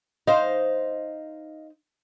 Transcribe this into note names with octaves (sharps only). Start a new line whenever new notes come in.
D#4 C5 D#5 F5